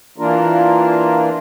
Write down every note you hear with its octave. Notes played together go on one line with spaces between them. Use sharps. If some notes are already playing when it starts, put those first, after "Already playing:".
E3 A#3 D4 F4 A#4